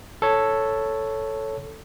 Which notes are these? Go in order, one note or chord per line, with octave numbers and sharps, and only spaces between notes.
A4 C#5